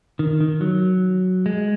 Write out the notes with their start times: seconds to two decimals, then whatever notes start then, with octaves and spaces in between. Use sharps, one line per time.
0.19 D#3
0.40 D#3
0.61 F#3
1.46 G#3